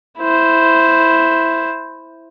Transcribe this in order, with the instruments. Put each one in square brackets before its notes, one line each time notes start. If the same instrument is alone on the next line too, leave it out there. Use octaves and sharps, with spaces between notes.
[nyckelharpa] E4 C5